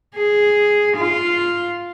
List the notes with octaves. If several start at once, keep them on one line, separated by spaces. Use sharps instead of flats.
G#4
F4